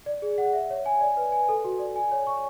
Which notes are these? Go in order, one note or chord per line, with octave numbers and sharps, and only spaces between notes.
D5
G#4
F#5
E5
C#5
G#5
D5
B4
G#5
A4
F#4
D5
G#5
C#5
C#6